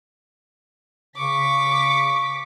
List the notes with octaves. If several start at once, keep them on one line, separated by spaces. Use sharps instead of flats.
C#3 C#6 D6 B6